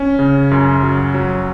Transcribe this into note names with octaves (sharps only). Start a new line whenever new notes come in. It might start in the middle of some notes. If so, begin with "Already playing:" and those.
Already playing: C#4
C#3
F#2
F#3
F#3